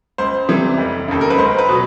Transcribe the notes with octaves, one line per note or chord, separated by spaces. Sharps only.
C#2 C5
C3 E3 G3
F1
D#2 C#3 A4
A#4
B4
C#2 C5
B4
B2 F#3